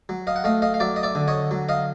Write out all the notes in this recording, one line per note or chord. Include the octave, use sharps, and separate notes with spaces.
F#3
D#5 F5
F#5
A3 D#5 F5
D#5 F5
F5
F#3 D5 E5
D#5
D5 E5
D3
C#5 D#5
F#3
D#5 F5